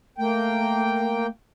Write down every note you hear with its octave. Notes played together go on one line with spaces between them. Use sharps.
A3 A#3 G5